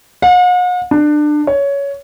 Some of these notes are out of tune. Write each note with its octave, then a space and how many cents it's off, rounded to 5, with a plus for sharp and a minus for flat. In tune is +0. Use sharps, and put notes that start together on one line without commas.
F#5 -45
D4 +25
C#5 +15